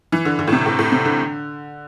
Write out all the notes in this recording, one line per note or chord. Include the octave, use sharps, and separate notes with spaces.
E3
D3
D3
A2
C3
A2
A2
C3
D3